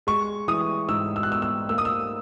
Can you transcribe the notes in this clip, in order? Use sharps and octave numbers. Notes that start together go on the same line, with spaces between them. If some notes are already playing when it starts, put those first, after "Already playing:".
G#3 C#6
E3 D#6
G#2 E6
E6
F#6
B3 E6
E6
A#3 E6
D#6
E6